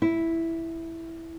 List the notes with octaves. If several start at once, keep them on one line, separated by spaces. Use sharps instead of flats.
E4